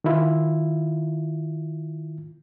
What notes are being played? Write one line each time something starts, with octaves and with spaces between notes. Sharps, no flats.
D#3 E4 F4